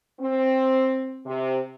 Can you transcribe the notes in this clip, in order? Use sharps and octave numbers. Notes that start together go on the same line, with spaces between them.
C4
C3